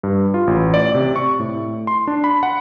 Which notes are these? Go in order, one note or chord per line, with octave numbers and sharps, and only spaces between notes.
G2
F4
A1
D5
C3
C#6
A2
C6
D4
B5
F#5